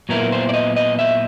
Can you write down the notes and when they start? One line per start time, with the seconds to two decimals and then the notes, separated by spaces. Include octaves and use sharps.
0.09 A#2 F#3 B3 E4 A#4
0.32 C5
0.49 D5
0.54 D#5
0.76 D#5
0.99 E5